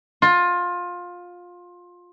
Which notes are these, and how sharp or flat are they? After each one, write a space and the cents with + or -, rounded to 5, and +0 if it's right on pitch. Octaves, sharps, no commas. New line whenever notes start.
F4 +20